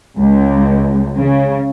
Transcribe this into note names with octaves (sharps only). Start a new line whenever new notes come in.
C#2
C#3